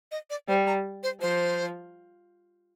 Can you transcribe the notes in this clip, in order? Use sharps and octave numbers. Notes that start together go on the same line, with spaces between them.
D#5
D5
G3 C5
A#5
C5
F3 C5